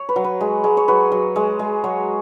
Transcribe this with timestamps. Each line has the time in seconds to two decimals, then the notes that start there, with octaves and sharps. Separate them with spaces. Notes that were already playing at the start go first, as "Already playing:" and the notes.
Already playing: C#5
0.09 B4
0.16 F#3
0.24 B4
0.40 G#3
0.64 G#3
0.77 C#5
0.88 F#3 B4
1.12 F#3
1.36 G#3
1.59 G#3
1.84 F#3 C#5